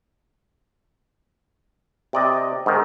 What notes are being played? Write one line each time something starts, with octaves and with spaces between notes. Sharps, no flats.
C3 D5 D#5
G#2 D#3